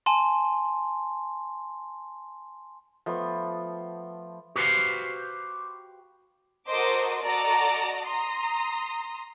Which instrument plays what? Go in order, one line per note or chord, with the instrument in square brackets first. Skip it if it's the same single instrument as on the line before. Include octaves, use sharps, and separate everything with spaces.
[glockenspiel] G#5 A5 C6
[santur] F3 A3 B3
[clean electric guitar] F#4 G4 B4 C5 F5
[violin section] F#4 A4 A#4 C5 D#5 D6
F#4 A4 D5 D#5 A#5 D6
A#5 C6 D#6